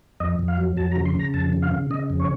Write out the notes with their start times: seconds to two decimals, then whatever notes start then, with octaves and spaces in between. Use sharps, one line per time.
0.20 F2 D#5
0.39 F2
0.48 F5
0.58 F#3
0.77 F2 A5
0.91 A#5
0.96 C#3
1.05 C6
1.15 C#3 A#5
1.34 F2 A5
1.53 C#3
1.62 F5
1.71 C#3
1.90 C#3 D#5
2.10 F2
2.20 C#5